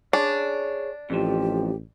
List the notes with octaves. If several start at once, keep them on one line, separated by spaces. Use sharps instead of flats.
D4 G#4 C#5
A1 F2 F3 G4